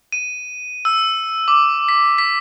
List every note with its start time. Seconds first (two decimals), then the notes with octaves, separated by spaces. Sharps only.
0.12 D#7
0.85 E6
1.48 D6
1.89 B6
2.18 B6